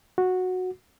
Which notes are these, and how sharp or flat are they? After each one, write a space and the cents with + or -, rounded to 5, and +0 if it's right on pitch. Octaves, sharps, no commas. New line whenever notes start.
F#4 -10